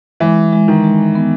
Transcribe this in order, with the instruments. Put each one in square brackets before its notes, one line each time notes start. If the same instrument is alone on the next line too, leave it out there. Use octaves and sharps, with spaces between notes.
[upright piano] E3 [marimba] G#3
[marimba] G#3
[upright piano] D#3
[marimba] G#3
B3